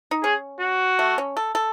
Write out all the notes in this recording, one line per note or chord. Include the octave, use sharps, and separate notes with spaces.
D#4
C#4 G#4
F#4
A3
C#4
A4
A4